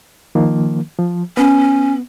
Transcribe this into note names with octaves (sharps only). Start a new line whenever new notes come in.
D#3 F3 A#3
F3
B3 C#4